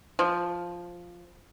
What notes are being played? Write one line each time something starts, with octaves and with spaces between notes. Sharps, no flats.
F3